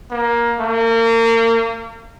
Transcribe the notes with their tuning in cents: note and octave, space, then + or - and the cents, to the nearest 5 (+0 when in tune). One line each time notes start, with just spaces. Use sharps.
A#3 +15
A#3 -35